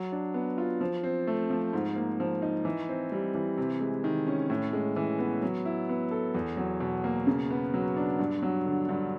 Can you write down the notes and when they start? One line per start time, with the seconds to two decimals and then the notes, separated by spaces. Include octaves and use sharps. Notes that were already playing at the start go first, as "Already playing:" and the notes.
Already playing: F#3
0.12 D4
0.34 B3
0.58 F4
0.81 F3
1.03 C4
1.27 A3
1.50 F3
1.73 G#2
1.96 A#3
2.20 F3
2.42 D#4
2.65 E3
2.89 C4
3.12 G3
3.35 E3
3.58 C3
3.81 G#3
4.04 D#3
4.27 C#4
4.50 A2
4.73 G#3
4.96 E3
5.19 B3
5.43 F#3
5.65 E4
5.89 B3
6.11 A4
6.34 E2
6.57 F#3
6.80 B2
7.04 A#3
7.27 C#3
7.50 B3
7.74 F#3
7.97 D4
8.19 G2
8.43 F#3
8.66 D3
8.89 G2